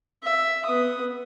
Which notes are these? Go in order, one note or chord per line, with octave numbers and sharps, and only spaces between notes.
E5
B3 D#6